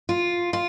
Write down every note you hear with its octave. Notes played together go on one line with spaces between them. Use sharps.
F4
F4